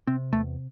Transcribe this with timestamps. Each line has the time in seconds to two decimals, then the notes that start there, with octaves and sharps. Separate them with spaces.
0.07 C3 C4
0.33 E2 A3